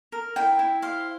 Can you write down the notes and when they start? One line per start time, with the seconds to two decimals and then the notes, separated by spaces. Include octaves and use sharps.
0.12 A#4
0.36 E4 G5
0.59 E4
0.82 C5 F5